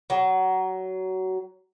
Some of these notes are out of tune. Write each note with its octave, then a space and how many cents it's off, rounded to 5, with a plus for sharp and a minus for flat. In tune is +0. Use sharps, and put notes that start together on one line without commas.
F#3 +20